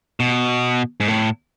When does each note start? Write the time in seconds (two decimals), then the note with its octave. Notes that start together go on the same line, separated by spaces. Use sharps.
0.20 B2
1.00 G#2
1.08 A2